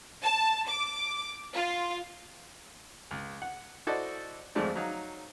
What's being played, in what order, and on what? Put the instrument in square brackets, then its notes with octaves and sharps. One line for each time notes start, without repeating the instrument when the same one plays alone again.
[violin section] A5
D6
F4
[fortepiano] C#2
F#5
E4 F#4 A4 C5 D5 D#5
G#1 F2 F3 G#3 A3 D5
F#3 D#4 F5